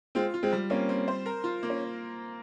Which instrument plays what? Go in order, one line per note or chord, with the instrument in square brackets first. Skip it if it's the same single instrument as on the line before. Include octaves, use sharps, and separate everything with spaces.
[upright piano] G#3 C4 [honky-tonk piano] F4
[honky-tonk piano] F4
[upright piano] G#3 C4
[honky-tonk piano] G3
[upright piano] A#3 C#4 [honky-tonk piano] C4
[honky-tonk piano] C4
C5
A#4
F4
A#3
[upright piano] C#4